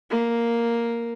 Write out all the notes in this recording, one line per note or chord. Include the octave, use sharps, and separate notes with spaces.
A#3